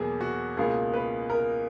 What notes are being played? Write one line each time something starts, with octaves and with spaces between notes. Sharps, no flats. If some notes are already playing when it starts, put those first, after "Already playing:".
Already playing: E2 B2 F#3 A#3 G#4
F#4
C#2 B2 A#3 G#4
B4
A#4